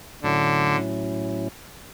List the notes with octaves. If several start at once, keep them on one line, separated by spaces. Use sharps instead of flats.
A2 D3 F#3 C#4 E4